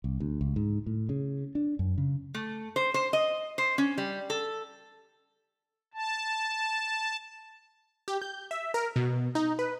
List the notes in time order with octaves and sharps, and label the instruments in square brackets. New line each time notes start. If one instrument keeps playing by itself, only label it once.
[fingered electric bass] C2
D2
C#2
G#2
A2
C#3
D4
F#2
C#3
[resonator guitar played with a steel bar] A3
C5
C5
D#5
C5
C#4
G3
A4
[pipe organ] A5
[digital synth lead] G4
G6
E5
A#4
B2
D#4
B4